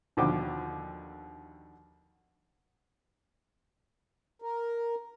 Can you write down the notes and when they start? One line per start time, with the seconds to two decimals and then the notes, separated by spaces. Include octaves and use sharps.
0.17 D#2 B2 D3 F3 G5 D6
4.42 A#4